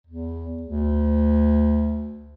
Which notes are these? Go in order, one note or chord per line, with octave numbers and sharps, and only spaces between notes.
E2
D2